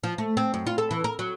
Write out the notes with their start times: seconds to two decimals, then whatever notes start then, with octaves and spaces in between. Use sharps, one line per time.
0.04 F3
0.18 A3
0.37 C4
0.54 F#2
0.67 F4
0.78 A4
0.91 E3
1.04 A#4
1.19 F#3